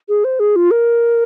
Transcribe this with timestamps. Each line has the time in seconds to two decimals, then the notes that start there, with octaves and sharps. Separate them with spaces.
0.09 G#4
0.24 C5
0.39 G#4
0.56 F4
0.71 A#4